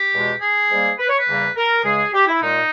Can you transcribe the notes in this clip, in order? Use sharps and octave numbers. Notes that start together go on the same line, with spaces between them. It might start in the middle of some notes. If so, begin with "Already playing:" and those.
Already playing: G4
E2 B2 G#3
G#4
G#2 G3 A#3
B4
C#5
B4
E2 C#3 G3 A#3
A#4
C#2 C#3 G#3 G#4
G4
E4
A#2 G#3 D#4